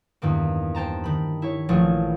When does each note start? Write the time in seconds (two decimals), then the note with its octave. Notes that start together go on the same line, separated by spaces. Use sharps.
0.22 E2 G2 D#3 A#3
0.75 C5 G5 A5 A#5
1.04 D#3 B5
1.42 E4 C#5
1.69 A#1 E3 F3 A3 G#4